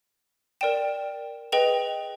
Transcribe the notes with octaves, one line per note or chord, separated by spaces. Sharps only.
A#4 D5 G5 E7
G#4 B4 D#5 G5 F7